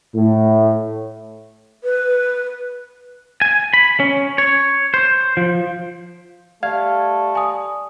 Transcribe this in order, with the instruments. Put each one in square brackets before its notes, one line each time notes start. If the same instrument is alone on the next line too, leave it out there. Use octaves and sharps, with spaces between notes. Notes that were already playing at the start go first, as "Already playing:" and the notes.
[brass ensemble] A2
[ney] B4
[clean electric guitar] G#5
B5
C#4
C#5
C5
F3
[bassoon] G3 [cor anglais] A3 [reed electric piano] F5 [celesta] G#6
[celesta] G#5 D#6